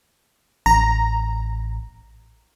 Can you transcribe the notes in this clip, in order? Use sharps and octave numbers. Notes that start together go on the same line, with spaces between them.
A1 A#5